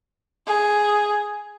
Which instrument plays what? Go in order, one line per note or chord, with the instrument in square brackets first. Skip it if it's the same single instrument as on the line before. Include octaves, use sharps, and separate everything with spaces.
[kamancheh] G#4